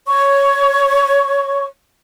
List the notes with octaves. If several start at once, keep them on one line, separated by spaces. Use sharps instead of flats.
C#5 C#6